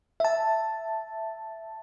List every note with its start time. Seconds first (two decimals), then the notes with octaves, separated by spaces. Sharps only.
0.20 E5 A5